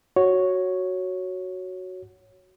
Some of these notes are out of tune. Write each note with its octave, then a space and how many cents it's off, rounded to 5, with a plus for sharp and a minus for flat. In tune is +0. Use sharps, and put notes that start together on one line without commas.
F#4 +0 C#5 +0